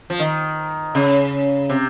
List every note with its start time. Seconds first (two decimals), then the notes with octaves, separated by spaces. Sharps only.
0.10 F3
0.19 D#3
0.95 C#3
1.69 C3